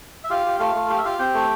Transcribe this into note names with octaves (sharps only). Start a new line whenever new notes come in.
E5
F4 G4 F5
G4
A3 F4 F5
A3
G4 F5
E5
F4 G4 F5
C4 G4 G5
A3